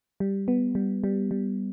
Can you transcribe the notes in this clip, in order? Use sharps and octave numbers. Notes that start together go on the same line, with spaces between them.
G3
B3
G3
G3
G3